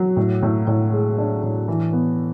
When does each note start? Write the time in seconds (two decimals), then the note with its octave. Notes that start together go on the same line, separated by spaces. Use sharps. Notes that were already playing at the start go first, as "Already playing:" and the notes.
Already playing: F#3
0.17 A2
0.42 A2
0.67 A2
0.92 G#3
1.18 D4
1.43 A2
1.68 E3
1.93 B3